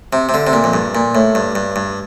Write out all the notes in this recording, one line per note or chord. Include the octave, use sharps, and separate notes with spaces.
C3
C3
D3
C3
A#2
F2
G2
A#2
A2
G2
G2
G2